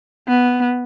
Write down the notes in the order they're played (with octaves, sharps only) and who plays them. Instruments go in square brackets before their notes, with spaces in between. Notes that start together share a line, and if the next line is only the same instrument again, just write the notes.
[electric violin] B3